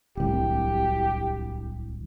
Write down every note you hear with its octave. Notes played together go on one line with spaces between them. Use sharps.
D1 C2 G4